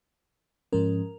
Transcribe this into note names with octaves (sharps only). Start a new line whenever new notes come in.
G#2 F3 G#3 C#4 A#4